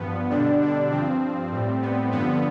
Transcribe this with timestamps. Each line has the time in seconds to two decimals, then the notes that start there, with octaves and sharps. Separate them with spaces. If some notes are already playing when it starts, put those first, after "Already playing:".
Already playing: G2 F3 B3
0.30 B2 D3 G3 D4
0.61 D3 D4
0.91 G2 F3 C4
1.51 A2 G3
1.82 B3
2.11 G2 D3 F3 B3